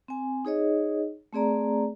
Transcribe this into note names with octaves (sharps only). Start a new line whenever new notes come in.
C4 G#5
D#4 G#4 C#5 D#5
A3 C4 G#4 D5 A#5